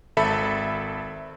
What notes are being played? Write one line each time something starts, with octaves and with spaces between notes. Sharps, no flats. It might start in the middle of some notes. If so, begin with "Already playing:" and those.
G#1 A4 E5 B5